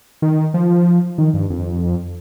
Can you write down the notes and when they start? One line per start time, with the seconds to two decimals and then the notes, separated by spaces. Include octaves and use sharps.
0.22 D#3
0.54 F3
1.18 D#3
1.34 G2
1.50 F2